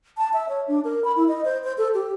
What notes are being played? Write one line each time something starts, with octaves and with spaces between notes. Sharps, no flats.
A5
E5
C#5
D4
A#4
B5
E4
D#5
C5
C5
A4
G4